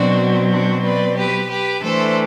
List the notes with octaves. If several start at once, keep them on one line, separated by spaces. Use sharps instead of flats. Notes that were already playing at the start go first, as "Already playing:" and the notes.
Already playing: B2 F#3 C4 D4 F#4
D4 F#4
B4 D5
G4 B4
G4 B4
E3 A3 D4 A4 C5